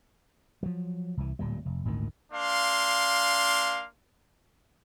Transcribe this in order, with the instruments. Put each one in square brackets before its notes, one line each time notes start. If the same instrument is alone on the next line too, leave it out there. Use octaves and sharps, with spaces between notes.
[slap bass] F3 F#3
C2 E3
D1 A#2 G3
F1
G#1 D2 A#2 D#3
[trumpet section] A#3 D4 F5 C6